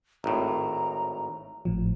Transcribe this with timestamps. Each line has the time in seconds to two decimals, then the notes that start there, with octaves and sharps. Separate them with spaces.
0.24 G#1 A2 A#5
1.65 G#1 A2 F3